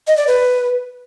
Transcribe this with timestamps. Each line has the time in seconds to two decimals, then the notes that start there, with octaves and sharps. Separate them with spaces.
0.07 D#5
0.17 D5
0.27 B4